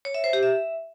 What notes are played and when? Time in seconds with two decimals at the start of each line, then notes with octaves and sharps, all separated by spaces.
0.05 C#5
0.14 E5
0.24 C5
0.33 G4
0.43 E5